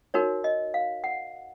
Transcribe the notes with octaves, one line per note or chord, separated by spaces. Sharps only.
D#4 F#4 A#4 C#5
D#5
F5
F#5